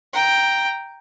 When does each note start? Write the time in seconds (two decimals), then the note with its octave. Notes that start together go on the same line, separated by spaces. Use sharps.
0.13 G5 A#5